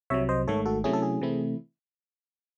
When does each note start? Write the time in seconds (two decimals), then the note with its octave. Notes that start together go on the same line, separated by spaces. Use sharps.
0.10 C2 C3 F#3 C#5 E5
0.29 C5 D#5
0.47 G#1 G#2 D#3 A3 A4 C#5
0.66 F#4 A4
0.84 C3 F#3 A3 C#4 E4 G#4
0.93 A4
1.03 G#4
1.21 C3 E3 A3 C4 E4